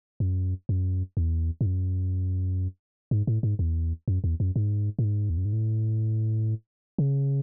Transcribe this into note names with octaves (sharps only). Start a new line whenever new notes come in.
F#2
F#2
E2
G#2
F#2
G#2
A2
G#2
E2
F#2
E2
F#2
G#2
A2
G#2
E2
F#2
G#2
A2
C#3